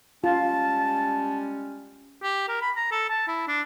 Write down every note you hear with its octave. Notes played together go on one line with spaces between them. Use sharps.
G3 G#3 C#4 F4 A5
G4
A#4
B5
A#5
A4
A5
E4
D4